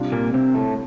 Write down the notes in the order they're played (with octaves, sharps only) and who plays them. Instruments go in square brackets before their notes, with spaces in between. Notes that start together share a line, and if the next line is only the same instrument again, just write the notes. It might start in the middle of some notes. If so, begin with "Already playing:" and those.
Already playing: [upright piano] C3 G3 D4 F4
[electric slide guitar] A#2 A#3
C3 C4
A2 A3